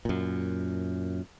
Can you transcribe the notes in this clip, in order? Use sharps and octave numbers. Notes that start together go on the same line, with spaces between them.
F#2 A#2